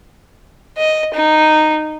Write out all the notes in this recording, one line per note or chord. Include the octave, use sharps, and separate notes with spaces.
D#5
D#4